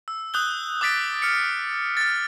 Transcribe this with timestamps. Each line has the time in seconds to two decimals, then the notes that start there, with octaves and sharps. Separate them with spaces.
0.08 E6
0.34 D#6 F#6 G6 G7
0.81 D6 D#6 A6 B6 D7
1.22 F6 C#7
1.97 F6 A6